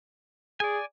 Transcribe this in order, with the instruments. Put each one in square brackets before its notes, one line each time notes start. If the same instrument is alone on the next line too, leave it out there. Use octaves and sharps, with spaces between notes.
[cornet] G#4 [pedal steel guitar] D5 G#5